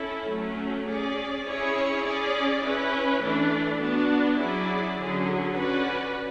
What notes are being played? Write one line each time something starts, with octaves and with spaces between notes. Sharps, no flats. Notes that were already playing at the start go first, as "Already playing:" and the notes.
Already playing: C#4 E4 A4
F#3 A3 C#4
C#4 G#4 D5
C#4 E4 G#4 C#5
C#4 G#4 D5
C#4 E4 B4
E3 A3 D4
B3 D4 F#4
F#3 C#4 E4 G#4 D5
D3 F#3 C#4 G#4
C#4 F#4 B4 D5